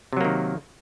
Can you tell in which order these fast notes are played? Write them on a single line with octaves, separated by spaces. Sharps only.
C3 F#3 A#3 D#3